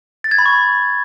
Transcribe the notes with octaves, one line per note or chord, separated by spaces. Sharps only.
A6
G#6
B5
C#6